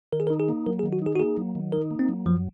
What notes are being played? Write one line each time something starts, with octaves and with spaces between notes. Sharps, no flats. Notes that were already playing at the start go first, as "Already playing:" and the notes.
D#3 A#4
G#4
A#4
D#4
G#4
A#3
F#3 A#4
G#4
D#3
F#4
D#4 G#4
F#4
A#3 G#4
F#3
D#3
D#4 A#4
A#3
C4
F#3
F#2 F3